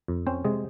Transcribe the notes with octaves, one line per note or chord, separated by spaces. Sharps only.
F2
C4 C#4 C5
C3 G#3 G#4